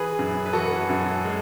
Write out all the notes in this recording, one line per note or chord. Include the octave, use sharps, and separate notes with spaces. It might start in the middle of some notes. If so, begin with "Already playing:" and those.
Already playing: E3 G#4 B4
F#2
B4
E3 F#4 A4
F#2
G#3